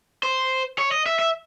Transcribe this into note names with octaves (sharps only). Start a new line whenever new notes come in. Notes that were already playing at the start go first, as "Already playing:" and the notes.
C5
C#5
D#5
E5
E5